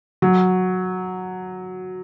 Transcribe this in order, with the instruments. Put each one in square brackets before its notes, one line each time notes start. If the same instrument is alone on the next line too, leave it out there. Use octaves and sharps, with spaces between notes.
[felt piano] F#3